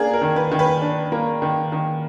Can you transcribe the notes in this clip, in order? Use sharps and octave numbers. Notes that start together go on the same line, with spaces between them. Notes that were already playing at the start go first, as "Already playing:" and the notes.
Already playing: A#3 D4 G#4
A#4
D#3
B4
D#3
B4
D4
A#3
D#3
D#3